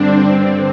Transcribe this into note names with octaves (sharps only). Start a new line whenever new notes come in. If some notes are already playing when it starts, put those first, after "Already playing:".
Already playing: G2 D3 C4 D4
G2 D3 C4